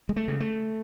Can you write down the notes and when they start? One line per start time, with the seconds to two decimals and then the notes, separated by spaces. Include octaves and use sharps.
0.09 G#3
0.16 A3
0.28 C#3
0.40 A3